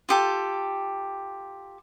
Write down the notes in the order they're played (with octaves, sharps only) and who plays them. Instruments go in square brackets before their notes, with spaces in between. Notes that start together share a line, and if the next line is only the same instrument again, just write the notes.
[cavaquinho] F4 G4 A4